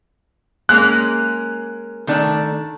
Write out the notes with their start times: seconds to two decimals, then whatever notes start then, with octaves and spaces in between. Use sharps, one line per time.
0.69 G#3 A#3 C#4 F#6
2.07 D#3 A3 D4